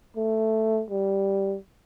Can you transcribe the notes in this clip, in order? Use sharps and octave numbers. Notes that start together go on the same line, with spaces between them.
A3
G3